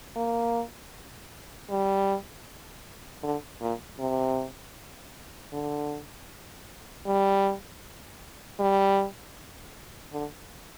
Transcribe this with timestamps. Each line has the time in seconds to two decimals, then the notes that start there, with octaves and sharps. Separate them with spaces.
0.16 A#3
1.70 G3
3.23 D3
3.61 A#2
3.99 C3
5.53 D3
7.07 G3
8.59 G3
10.13 D3